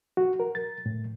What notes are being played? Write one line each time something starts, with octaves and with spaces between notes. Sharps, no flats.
F#4
A#4
A6
A2